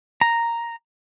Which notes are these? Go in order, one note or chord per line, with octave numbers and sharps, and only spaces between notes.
A#5